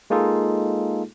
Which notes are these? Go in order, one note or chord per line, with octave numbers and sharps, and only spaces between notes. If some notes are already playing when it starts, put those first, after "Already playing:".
G#3 A#3 D#4 F4 G#4 A4